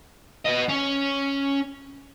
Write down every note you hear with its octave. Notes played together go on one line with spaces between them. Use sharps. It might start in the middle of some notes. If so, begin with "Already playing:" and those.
B3 D#5
C#4